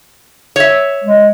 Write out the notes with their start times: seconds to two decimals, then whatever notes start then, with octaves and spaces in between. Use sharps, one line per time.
0.56 C#5 E5
1.04 G#3